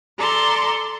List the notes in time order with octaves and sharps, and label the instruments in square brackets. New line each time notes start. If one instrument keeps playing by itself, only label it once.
[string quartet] A4 D5 A#5 C6